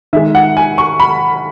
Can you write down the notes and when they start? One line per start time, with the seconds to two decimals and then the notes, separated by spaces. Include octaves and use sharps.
0.13 D#3 G#3 E5
0.35 F#5
0.57 G#5
0.78 C#6
1.00 B5